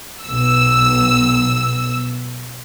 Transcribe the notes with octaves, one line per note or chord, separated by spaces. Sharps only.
B1 E6